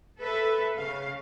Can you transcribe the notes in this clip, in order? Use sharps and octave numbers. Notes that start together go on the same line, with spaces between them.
A4 B4 E5
C#3 F5